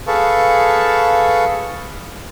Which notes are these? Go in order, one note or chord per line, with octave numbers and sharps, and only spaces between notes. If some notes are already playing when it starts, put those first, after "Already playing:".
G#4 A4 B4 F5 A5 C#6